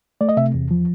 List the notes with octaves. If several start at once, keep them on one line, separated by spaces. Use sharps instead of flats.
A3 D5
D#5
C3 E5
E2
F3